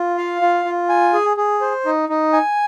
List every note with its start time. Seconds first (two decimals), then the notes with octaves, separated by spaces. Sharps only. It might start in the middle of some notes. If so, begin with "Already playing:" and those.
Already playing: F4
0.18 F5
0.41 F4
0.65 F4
0.89 G#5
1.13 G#4
1.37 G#4
1.61 C5
1.86 D#4
2.09 D#4
2.33 G#5